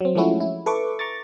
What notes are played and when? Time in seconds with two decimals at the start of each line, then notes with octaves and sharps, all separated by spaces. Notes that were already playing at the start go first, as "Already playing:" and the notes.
0.01 F#3 C4
0.15 F3 G#3 A3 C#4 E4 F#4
0.40 E4
0.66 A4 B4 E5 C#6 D6
0.99 A#5 C#6 D6 A6